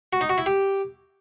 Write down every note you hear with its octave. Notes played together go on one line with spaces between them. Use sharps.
F#4
D#4
F#4
E4
G4